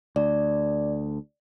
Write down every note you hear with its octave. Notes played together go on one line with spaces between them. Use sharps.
D2 D5